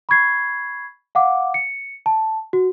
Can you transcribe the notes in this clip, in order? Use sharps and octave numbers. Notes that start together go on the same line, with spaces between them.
B5 C#6 G#6 C7
F5 F#5 D6
C#7
A5
F#4